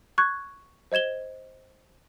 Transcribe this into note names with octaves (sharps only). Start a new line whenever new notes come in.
C#6 F#6 G#6
C5 D#5 G#6 E7 G7